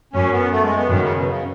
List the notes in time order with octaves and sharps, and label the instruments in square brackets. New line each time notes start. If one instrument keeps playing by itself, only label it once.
[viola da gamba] F#2 [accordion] C#4
[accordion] B3
A3
G#3
B3
[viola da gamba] F#2 [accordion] D#3
[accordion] C#3
B2
C#3